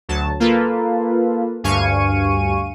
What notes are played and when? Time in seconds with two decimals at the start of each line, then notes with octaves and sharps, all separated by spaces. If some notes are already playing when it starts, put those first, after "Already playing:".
0.09 D2 F#3 A5
0.40 A#3 F4 A4 B4
1.64 D2 G2 F5 G#5 C#6 D#7